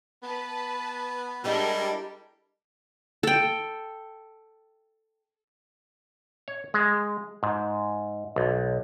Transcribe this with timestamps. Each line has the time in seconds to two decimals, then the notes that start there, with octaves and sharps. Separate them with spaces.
0.23 B3 B4 A5
1.44 G3 G#3 D4 E4 G4 A4 A#4
3.23 A4 G5
6.48 C#5
6.74 G#3
7.43 G#2
8.36 B1